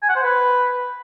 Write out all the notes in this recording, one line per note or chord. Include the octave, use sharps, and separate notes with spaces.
G#5
F#5
C5
B4